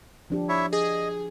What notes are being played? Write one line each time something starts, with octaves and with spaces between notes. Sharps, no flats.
F3 D4 G4
E4 C#5 E5
G#4 D#5